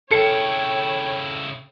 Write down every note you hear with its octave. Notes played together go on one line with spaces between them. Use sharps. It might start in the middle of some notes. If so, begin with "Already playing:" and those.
C#3 E4 A4 C#5 G5 C#7